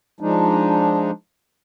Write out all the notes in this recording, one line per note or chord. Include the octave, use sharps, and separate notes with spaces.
F3 G#3 D4 D#4